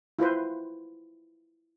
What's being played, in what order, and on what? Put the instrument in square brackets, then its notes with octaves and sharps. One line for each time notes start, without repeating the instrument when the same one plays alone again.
[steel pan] E4 F4 B4 C5